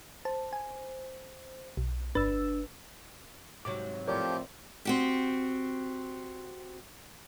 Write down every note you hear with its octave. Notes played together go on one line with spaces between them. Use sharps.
C5 A5
G#5
B1
G1 D4 B4 E6 A6
G#2 C3 F#3 D6
A2 F3 C4 G4 A#4 C#5 D5
C4 F#4 G4